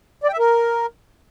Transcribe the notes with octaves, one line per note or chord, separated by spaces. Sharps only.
D5
G5
E5
A#4